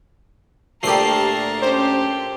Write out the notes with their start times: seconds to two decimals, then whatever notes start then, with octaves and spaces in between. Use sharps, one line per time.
0.83 D2 A#2 A3 G4 A#4 A5 C7
1.62 C#4 G4 C5